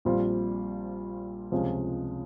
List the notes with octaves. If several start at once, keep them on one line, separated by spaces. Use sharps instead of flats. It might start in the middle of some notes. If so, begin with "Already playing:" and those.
A#1 A#2 G3 C4 F4
C#2 C3 F3 G#3 C#4